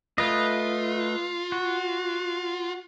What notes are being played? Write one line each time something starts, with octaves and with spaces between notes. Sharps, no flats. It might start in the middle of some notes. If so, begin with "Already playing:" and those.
A3 F4 B4 D#5
F#4